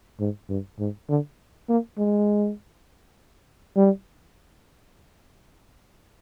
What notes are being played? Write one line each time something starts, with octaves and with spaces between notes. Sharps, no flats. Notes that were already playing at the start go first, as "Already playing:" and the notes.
G#2
G2
G#2
D3
A#3
G#3
G3